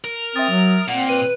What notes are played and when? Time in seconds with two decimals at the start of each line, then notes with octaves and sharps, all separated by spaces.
0.04 A#4
0.36 C4 E5 D#6 A6
0.49 F#3
0.88 A#2 C4 F#5
1.09 B4 D#7